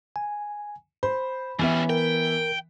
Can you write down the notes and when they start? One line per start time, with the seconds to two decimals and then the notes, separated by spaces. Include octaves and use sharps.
0.16 G#5
1.03 C5 B5
1.59 E3 G3 B3 C#4 E5
1.89 A#4 G5